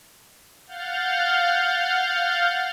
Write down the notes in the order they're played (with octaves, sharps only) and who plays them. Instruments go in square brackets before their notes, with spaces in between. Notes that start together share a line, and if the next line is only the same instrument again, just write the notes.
[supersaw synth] F5 F#5 F6 G6 A6